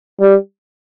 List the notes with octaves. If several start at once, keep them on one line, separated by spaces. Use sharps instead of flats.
G3